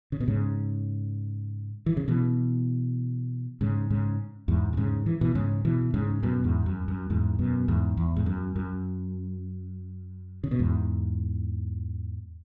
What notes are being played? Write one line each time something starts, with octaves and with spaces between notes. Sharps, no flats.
C#3
B2
G#2 C#3
E3
C#3
B2 E3
G#2 C#3
G#2 C#3
E2 G#2
B2
G#2 C#3
E3
B2 E3
G#2 C#3
B2 E3
G#2 C#3
F#2 B2
E2 G#2
F#2
F#2
E2 G#2
F#2 B2
E2 G#2
E2
G#2
F#2
F#2
C#3
B2
E2 G#2